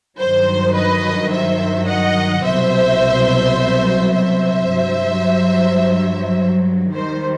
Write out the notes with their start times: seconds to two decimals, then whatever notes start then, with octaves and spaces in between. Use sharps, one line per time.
0.18 G2 D#3 F#3 C5
0.75 B4 D#5
1.31 C5 E5
1.87 D#5 F#5
2.43 C2 B2 F#3 C5 E5
4.12 C5 E5
4.69 G2 F#3
6.94 D#2 D#3 G3 C5